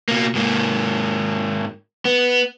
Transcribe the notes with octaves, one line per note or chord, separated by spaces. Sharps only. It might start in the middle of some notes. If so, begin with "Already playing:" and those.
B2 A#3
G#2 A#3
B3